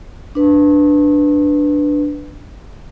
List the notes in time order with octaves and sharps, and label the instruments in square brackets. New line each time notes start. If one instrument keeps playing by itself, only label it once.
[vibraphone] D4 B4